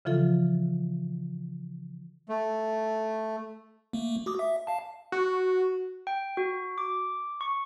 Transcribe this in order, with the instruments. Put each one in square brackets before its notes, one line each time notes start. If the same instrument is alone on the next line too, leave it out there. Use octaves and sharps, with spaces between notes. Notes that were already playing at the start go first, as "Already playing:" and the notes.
[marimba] C#3 E3 F3 F4 A4
[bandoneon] A3
[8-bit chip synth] A3 A#3
F#4 D6 D#6
E5
F5 A5
[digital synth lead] F#4
[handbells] G5
F#4
D6
C#6